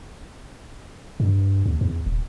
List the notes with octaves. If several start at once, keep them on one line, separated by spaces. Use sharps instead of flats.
G2
D#2
E2
D#1